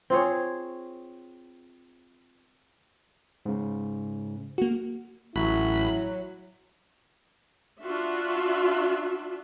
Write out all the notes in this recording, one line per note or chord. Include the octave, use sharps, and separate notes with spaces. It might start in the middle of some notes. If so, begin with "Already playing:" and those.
C4 F4 G#4 C#5
G#2 C#3
A#3 F#4
A1 F#3 E4 B5
D4 F4 F#4 E5